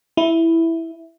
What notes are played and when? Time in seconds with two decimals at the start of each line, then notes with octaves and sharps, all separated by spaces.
0.17 E4